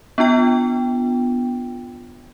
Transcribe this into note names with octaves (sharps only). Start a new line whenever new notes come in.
B3 D4 F4 G5